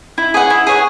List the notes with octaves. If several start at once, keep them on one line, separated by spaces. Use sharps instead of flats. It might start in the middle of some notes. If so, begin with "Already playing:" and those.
E4
G#4 C#5 F#5
E4
G#4 C#5 F#5